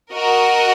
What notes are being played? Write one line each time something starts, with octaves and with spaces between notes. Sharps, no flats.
F#4 A#4 D#5 F#5